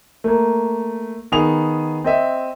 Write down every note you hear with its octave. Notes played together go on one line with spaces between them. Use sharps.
A3 A#3
D#3 B3 G#4 D#6 F7
C4 D#5 E5